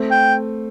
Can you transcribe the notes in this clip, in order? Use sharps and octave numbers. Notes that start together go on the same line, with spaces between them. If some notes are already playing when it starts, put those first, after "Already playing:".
Already playing: A3 C4
G5